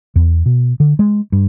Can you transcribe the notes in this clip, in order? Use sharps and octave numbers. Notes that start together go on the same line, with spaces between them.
E2
B2
D3
G#3
G2